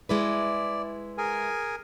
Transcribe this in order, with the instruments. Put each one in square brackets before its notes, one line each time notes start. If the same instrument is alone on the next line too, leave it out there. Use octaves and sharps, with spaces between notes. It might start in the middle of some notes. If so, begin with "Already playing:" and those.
[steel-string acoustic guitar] G#3 E4 B4 [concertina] D5
[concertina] G#4 A#4 G#5